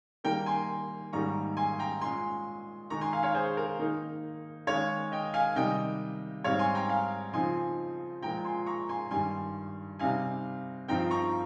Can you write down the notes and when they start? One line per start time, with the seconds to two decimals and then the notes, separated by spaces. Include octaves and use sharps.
0.24 D#3 G3 A#3 G5 A#5
0.46 G#5 C6
1.13 G#2 D#3 G3 A#3 C#4 A#5 C#6
1.57 G#5 C6
1.79 G5 A#5
2.01 A#2 G#3 C#4 G#5 C6
2.90 D#3 G#3 D#4 A#5 C#6
3.01 G#5 C6
3.13 F5 G#5
3.23 C#5 F5
3.35 G#4 C5
3.57 A#4
3.79 D#3 A#3 D#4
4.67 D#3 G#3 C#4 C#5 F5
5.12 D#5 G5
5.34 F5 G#5
5.56 C3 D#3 G3 D#5 G5
6.44 G#2 G3 C4 C#5 F5
6.59 G#5 C6
6.75 G5 A#5
6.89 F5 G#5
7.33 C#3 F3 C4 D#4 G#5 C6
8.22 A#2 F3 G#3 G5 A#5
8.44 G#5 C6
8.66 A#5 C#6
8.89 G#5 C6
9.11 G2 D#3 G3 G#5 C6
9.99 C3 G3 C4 D#4 F5 G#5
10.88 G2 F3 C4 D#4 G5 A#5
11.11 A#5 C#6